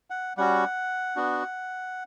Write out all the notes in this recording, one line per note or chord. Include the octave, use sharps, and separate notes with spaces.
F#5
G3 C#4 F#4 F#5
B3 D4 F#4